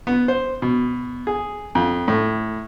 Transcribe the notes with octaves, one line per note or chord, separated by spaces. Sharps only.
B3
C5
B2
G#4
F2
A2